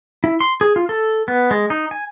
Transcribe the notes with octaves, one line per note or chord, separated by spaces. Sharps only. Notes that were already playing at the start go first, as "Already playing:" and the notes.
E4
C6
G#4
F4
A4
B3
G#3
D#4
G#5